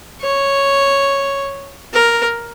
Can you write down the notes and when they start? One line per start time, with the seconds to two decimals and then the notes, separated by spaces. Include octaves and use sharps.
0.21 C#5
1.94 A#4